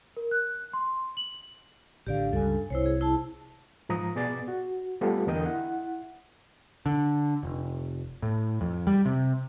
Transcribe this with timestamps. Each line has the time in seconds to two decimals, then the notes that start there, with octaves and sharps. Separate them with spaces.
0.17 A#4
0.31 F#6
0.73 C6
1.17 F#7
2.06 A1 D3 G4 D5 F5
2.33 C#2 G2 A4 G#5
2.70 C2 E4 C5 C#5
2.86 G#4
3.01 E4 A5
3.89 G#2 F3 A#5 D#6
4.15 B2 B3 G#4 D5 A6
4.48 F#4
5.01 G3 A3 B3 F4 G4 A4
5.27 E2 D3 A#4 D#5 G5 D#6
5.46 E4 F#5
6.86 D3
7.43 F1
8.22 A2
8.61 F2
8.87 G3
9.05 C3